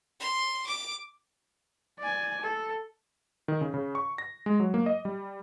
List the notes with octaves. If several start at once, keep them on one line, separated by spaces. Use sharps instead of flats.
C6
D6
D5 G#5
A4
D#3
C#3
C#3
C#6
A#6
G#3
F#3
A#3
D#5
G3